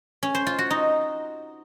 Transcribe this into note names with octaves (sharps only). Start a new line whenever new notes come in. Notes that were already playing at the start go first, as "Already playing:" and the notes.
C#4
C5
F4
F#4
D#4